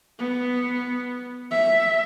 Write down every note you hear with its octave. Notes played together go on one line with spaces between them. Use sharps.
B3
E5